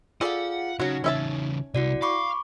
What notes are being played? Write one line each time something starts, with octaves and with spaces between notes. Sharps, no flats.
F4 G#4 A4 D5 F5 F#5
C#3 F#3 D#4 F#4
E2 C#3 C#4 E5 A5
C2 E4 F#4 D5
F5 B5 C#6 D6